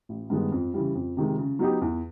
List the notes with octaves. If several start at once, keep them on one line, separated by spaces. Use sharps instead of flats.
A1
G2 D#3 G#3 B3
F2
C#3 E3 G3
F2
C3 D#3 G#3
C#3
F#3 B3 D#4 G4
E2